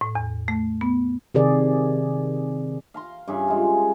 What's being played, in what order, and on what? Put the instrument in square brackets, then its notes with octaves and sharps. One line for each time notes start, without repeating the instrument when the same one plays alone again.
[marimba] A2
E2
A3
B3
[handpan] C3 D#3 G#4 D5
[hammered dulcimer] F5 A#5 C6
G2 C#3 G#4 E5
G#3 F4